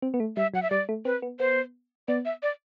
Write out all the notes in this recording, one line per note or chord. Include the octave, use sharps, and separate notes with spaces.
C4
B3
A3
G3 E5
F#3 F#5
E5
G3 D5
A3
C4 B4
B3
B3 C5
B3 D5
E5
D5